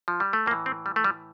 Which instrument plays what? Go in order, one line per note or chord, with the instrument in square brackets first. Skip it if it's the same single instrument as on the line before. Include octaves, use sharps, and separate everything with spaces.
[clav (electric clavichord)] F3
G3
A3
A2 A#3
E3
C4
G3
A3
G3